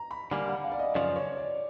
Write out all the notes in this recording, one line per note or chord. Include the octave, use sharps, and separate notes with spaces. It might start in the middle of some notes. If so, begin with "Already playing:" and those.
Already playing: A#5
B5
D3 G3 A#3 G#5
F#5
F5
D5
D#5
F#2 C#3 F3 D5
C#5
D5